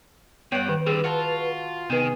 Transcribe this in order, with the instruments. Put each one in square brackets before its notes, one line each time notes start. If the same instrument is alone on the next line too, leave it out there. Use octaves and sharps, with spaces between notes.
[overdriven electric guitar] G2 [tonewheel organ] B3 C#5 A#6 [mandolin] F#5 G5
[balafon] D#3 [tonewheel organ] B4
[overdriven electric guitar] D3 G3 [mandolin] C4 [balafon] G#4
[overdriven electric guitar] F4 [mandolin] F#4 A5
[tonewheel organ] C3 [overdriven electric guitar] D#3 [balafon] B3 B4 [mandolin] D#4 G#4